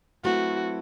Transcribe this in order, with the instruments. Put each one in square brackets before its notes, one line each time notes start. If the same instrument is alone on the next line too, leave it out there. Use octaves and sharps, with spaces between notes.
[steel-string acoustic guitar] F#3 A3 C4 E4 B4 [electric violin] F#4